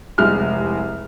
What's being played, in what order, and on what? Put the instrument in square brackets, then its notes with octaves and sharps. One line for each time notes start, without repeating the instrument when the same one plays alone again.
[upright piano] F1 C2 G#3 F6